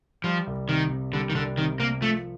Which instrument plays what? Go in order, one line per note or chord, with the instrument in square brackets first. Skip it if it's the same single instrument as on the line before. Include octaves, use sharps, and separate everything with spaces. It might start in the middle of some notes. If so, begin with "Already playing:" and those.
[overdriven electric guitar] F3 [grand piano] G3
[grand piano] C2
[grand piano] C3 [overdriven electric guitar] D#3
[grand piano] C3
[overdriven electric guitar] D3 [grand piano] G3
[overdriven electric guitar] D#3
[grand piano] C2 [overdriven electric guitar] D3
[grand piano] C3 [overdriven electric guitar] D#3
[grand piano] C3 [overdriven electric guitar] A#3
[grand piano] F3 [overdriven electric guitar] A3